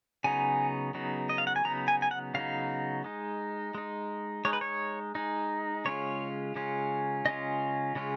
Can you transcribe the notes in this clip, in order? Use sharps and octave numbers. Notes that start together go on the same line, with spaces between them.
C#3 F#3 B3 D#4 G#5
C#3 F#3 B3 D#4
D#5
F5
F#5
G#5
C#3 F#3 B3 D#4 A#5
G#5
G#5
F#5
C#3 F#3 B3 D#4 F5
G#3 D#4
G#3 D#4
G#3 D#4 C#5
B4
C#5
G#3 D#4
C#3 G#3 C#4 F4 C#5
C#3 G#3 C#4 F4
C#3 G#3 C#4 F4 D#5
C#3 G#3 C#4 F4